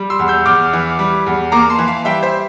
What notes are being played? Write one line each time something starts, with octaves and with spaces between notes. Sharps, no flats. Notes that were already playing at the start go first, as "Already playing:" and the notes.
Already playing: G3
C6 E6
E2
E6 G6
E2 D6 F6
E3
G3
E2
A#3 A#5 D6
A5 C6
E3
F5 A5
G3 E5 G5
C5 E5